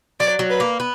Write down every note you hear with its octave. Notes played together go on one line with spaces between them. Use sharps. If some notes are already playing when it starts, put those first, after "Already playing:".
F#3 D5
F#3
B4
A#3
B3